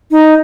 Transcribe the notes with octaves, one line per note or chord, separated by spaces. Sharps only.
D#4